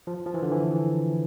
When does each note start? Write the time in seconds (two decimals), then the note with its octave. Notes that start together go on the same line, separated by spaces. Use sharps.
0.07 F3
0.26 F3
0.34 E3
0.42 D3
0.52 E3